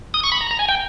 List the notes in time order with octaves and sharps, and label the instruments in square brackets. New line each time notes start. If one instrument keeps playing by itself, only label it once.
[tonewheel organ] D#6
C#6
B5
A#5
A#5
G#5
G5